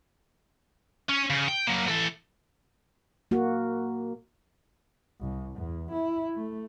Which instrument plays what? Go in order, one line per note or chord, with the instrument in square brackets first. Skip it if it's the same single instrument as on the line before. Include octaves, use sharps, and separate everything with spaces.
[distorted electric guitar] C#4
C#3
G5
F#3 A#3
E3 A4
[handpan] A#3 F#4
[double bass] C2
E2
E4
A3